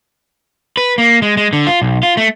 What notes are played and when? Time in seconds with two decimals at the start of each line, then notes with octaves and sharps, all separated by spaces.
0.77 B4
0.98 A#3
1.22 G#3
1.37 G#3
1.53 D3
1.67 F4
1.82 B1
2.03 F4
2.17 A3